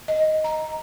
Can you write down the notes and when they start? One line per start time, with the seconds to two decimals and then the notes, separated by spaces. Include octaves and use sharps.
0.08 D#5
0.44 A#5